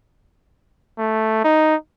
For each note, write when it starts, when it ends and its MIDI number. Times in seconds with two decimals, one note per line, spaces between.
0.98 1.41 57
1.44 1.75 63